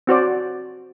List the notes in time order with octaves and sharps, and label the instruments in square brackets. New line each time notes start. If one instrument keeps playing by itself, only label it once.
[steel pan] C4 F#4 C5 D5